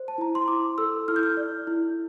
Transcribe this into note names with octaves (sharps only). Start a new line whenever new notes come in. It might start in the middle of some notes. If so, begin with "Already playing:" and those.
Already playing: C5
A5
E4 A#5
C6
E4 D6
A4 E6
E4 F6
G6
F6
D5
E4